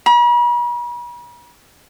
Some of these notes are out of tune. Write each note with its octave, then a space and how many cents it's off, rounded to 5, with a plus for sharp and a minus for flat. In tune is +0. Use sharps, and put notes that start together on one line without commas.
B5 -45